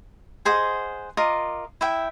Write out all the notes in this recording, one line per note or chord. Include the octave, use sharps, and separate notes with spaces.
G#4 C5 D#5 F#5
F4 A#4 D#5 D6
E4 E5 G5